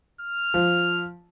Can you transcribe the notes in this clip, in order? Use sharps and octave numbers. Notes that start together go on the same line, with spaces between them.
F6
F3